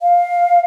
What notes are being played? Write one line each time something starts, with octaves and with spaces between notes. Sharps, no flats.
F5